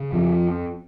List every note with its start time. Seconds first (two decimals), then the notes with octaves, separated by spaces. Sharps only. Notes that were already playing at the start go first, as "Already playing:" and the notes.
Already playing: C#3
0.12 F2 F3